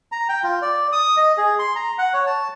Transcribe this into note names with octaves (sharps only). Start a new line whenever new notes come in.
A#5
G5
F4
D5
D#6
D#5
G#4
C6
A#5
F#5
C#5
A5